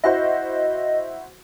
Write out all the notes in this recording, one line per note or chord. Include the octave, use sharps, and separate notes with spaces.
E4 F#4 C5 D#5